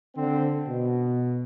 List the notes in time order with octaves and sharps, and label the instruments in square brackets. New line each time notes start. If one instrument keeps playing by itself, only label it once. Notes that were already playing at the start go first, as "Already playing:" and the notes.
[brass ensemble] D3 C4
B2